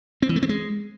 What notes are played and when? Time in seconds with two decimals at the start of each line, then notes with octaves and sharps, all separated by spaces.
0.22 C4
0.29 E3
0.36 A3
0.43 C4
0.49 G#3